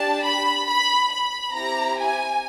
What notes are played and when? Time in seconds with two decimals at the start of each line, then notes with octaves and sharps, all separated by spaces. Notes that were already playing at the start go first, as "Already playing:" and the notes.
Already playing: D4 G4 A5
0.25 B5
0.69 B5
1.12 B5
1.55 C4 E4 G4 A#5
1.99 G#5